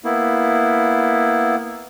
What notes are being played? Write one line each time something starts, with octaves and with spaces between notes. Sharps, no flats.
A#3 B3 E4